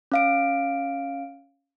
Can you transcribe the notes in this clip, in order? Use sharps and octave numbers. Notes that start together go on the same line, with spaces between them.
C#4 F5 D7